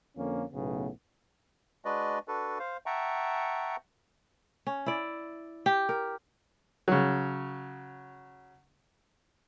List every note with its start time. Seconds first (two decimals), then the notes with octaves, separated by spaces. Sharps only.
0.17 F2 D3 A#3 C#4
0.53 B1 A2 C#3 B3
1.85 G#3 D4 F#4 B4 D5 D#5
2.28 D4 F#4 A4 B4
2.59 C5 F5
2.86 E5 F#5 G5 A5 A#5 C#6
4.67 C#4
4.86 E4 D5
5.66 G4
5.89 A#4
6.88 C#3 F#3